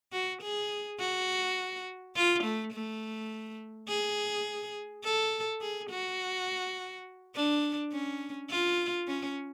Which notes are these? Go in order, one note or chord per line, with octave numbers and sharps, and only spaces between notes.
F#4
G#4
F#4
F4
A3
A3
G#4
A4
G#4
F#4
D4
C#4
F4
C#4